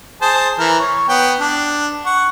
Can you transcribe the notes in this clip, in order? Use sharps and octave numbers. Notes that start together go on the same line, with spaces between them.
G#4 C5 A5
E3 A#4
C#5
B3 G5
D4
F#5 C#6